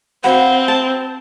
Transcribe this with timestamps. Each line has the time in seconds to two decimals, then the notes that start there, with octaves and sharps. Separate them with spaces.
0.24 C4 F#4 C5 F5 F#5 B5
0.68 A5